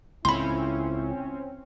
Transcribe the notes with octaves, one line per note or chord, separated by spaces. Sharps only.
C#2 A2 C4 C#4 E4 B5 C6